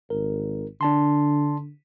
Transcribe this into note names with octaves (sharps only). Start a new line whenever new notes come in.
G#1 A#4
D3 D4 A5 C6